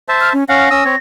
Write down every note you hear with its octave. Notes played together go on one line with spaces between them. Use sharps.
C5 E5 A5
F6
C#4
C#4 F5 F#5 A#6
C#4 D#6 E6
C4 C#5